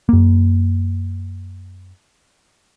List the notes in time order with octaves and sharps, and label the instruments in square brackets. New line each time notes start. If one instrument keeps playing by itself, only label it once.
[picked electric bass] F#2 A#3